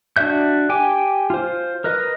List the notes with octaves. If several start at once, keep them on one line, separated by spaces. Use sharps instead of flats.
D4 F#4 D5 E5 G6
G4 G5 G#5 D6
F4 C5
A#4 B4 D#5